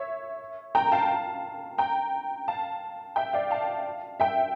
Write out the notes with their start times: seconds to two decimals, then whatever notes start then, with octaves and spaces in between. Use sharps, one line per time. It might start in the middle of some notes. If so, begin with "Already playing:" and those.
Already playing: C#5 E5
0.75 G5 A#5
0.92 F5 A5
1.78 G5 A#5
2.48 F5 A5
3.16 E5 G5
3.33 D5 F5
3.51 F5 A5
4.20 E5 G5